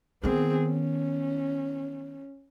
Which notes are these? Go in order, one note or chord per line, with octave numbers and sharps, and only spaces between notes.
D#3 B3 C4 G#4
C#4